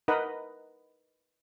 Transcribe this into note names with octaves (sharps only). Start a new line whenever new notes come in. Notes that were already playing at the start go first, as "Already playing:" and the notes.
D#4 A#4 B4 D#5 F#5 B5